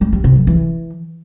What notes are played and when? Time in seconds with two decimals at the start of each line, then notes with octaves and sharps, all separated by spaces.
0.01 G3
0.13 G3
0.24 C3
0.36 F#3
0.47 E3